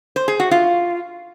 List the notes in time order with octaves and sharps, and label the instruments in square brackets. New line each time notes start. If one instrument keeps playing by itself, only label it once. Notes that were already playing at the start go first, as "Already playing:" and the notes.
[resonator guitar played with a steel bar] C5
G#4
F#4
F4